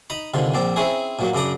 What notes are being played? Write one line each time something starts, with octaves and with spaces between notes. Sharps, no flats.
D#4 A#5 B5
C2 D3 D#3 F4
A#1 C4 D5
C4 C#4 E4 G#4
A#2 F#3 A#3
F#2 C#3 D4 D6 D#6